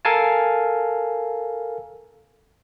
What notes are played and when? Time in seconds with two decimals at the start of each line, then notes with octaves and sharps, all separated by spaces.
0.05 A4 A#4 F5 G#5 A5